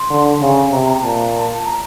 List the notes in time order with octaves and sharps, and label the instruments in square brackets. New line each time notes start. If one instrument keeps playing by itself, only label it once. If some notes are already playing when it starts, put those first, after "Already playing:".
Already playing: [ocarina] C6
[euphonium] D3
C#3
[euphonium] C3 [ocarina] A#5
[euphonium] A#2 [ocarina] A5
[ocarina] A#5